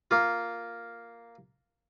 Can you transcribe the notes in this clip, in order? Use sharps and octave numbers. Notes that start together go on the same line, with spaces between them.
A#3 F4